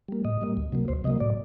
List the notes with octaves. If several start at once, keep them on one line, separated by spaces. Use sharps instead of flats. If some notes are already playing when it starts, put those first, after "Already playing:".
G3 A#3
A2 D#5
G3 A#3
D2
C3 F#3 A#3
D2 C5
C3 F#3 A#3 D#5
A2 D5